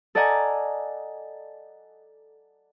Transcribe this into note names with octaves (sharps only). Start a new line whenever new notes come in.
A4 D5 D#5 F#5 G#5 A#5